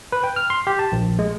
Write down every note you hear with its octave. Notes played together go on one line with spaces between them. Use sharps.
B4
G5
F6
C6
G4
A5
A#1
G#3